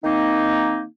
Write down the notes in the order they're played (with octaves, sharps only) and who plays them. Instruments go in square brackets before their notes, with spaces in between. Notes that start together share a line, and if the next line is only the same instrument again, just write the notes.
[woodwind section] D#3 A#3 C4 D#4